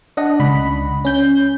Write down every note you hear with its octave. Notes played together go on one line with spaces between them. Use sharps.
D4 D#5 F#5
C#2 B5
C#4 G6